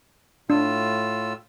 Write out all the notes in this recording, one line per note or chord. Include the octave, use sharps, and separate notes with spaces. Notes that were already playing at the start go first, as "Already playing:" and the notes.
A2 D4 F4 E6